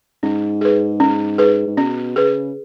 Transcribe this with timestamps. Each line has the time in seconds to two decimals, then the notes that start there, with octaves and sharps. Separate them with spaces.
0.23 G#2 C#4
0.61 G#4 B4
1.00 C#4
1.38 G#4 B4
1.67 G#2
1.77 B2 C#4
2.16 C#3 G#4 B4